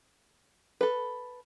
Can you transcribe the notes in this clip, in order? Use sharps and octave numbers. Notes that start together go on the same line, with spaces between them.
A4 B4